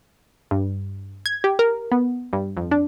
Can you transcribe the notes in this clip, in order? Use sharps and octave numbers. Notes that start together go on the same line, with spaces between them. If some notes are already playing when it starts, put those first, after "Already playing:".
G2
G#6
G4
A#4
B3
G2
F2
D4